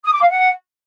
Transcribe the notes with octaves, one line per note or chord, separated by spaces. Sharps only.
D#6
D6
F5
F#5